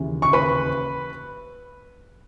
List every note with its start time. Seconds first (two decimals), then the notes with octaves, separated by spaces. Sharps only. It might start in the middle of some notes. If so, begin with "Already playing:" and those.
Already playing: D#2 C#3 E3
0.22 C#6
0.33 B4 B5